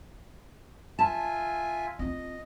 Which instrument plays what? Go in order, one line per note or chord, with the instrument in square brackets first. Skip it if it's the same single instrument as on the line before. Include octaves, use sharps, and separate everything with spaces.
[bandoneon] F4 E5 G#5 [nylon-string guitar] A5
[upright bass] C4 F4 [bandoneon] D#5